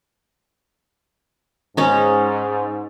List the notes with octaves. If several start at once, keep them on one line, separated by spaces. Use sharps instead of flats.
G#2 C#4 D#4